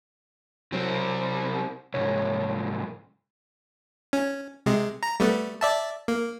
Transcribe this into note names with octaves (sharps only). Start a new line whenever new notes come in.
C2 F#3 C4
C2 G#2 C#5
C#4
C3 G#3
A#5
G3 A3 B3
D5 E5 A5
A#3